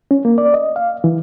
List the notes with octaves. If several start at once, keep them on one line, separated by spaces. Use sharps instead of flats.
C#4
A#3
D5
D#5
F5
E3